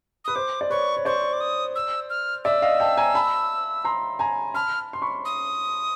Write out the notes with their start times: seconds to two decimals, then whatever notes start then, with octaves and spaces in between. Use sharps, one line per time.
0.25 B4 D#6
0.35 C5 D6
0.61 D5
0.70 B4 C#5 C#6
0.97 C#5
1.05 C5 D5 C#6
1.33 D6
1.40 D#6
1.75 E6
2.10 F6
2.45 D5 E5 E6
2.62 D#5 F5
2.80 G5 A5
2.97 G#5 A#5
3.15 A5 B5
3.85 A#5 C6
4.19 G#5 A#5
4.54 A5 B5 F6
4.93 C6
5.02 B5 C#6
5.25 D#6